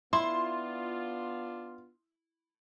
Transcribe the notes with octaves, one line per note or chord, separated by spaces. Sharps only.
B3 D4 E4 F4 C6